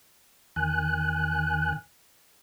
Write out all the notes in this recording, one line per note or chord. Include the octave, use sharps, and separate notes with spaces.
E2 D#3 G#5 F#6